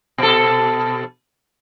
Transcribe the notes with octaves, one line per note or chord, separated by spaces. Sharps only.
B2 A4